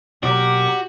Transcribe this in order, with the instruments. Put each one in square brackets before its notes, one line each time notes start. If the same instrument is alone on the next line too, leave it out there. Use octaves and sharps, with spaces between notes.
[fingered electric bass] B2 F#3 A#3 [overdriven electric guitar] F#4 [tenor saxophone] G4 [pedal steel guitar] A#4 D5